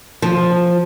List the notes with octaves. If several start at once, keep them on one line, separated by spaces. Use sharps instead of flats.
F3